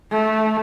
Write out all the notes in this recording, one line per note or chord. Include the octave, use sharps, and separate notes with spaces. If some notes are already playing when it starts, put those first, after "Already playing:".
A3